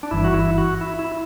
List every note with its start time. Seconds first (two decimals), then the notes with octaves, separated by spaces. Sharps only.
0.03 D4
0.11 G1 G2 E3 E4
0.24 F#4
0.34 E4
0.58 F#4
0.81 E4
0.99 E4